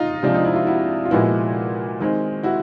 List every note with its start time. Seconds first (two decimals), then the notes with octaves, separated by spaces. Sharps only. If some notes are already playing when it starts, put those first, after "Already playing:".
Already playing: D#4 F4
0.23 C3 F3 G#3 D4
0.34 D#4
0.45 E4
0.56 F4
0.67 E4 F#4
1.05 F4
1.11 A#2 F3 G#3 B3 E4 F#4
2.00 D#3 G#3 C4
2.43 E4 F#4